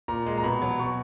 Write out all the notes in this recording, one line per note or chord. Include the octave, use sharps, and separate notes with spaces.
A#2 A#5
G#3
A#5
B2 B5
F#3
B2 C#6